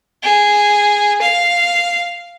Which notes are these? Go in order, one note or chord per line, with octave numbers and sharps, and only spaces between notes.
G#4
F5